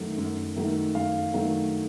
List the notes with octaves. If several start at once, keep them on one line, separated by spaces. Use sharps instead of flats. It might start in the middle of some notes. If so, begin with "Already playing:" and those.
Already playing: F#2 D#3 F#3 A3
F#2
D#3 F#3 A3
F#2 F5
D#3 F#3 A3